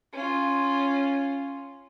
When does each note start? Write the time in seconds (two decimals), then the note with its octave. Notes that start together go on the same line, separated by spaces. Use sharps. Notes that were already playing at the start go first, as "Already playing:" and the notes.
0.13 C#4 F4